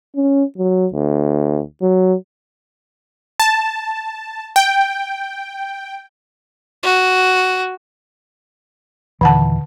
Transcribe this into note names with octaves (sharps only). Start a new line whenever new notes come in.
C#4
F#3
D2
F#3
A5
G5
F#4
D#2 A#2 D3 E3 F#5 A5